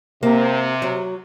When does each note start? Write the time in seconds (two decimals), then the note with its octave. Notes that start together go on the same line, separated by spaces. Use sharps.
0.23 C3 A#3
0.82 F#3